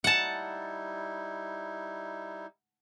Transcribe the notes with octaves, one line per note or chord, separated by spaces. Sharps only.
G3 D#4 E4 F#5 A5